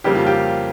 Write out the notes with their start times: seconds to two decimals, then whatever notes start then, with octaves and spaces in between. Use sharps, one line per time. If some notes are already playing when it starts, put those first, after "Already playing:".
0.04 F2 C#3 G3 A#3 G4
0.15 F4
0.27 G4